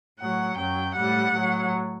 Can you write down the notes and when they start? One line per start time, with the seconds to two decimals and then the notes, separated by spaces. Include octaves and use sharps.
0.20 A2 F#3 F#5
0.58 F#2 F#3 G5
0.96 A2 G3 F#5
1.36 A2 F#3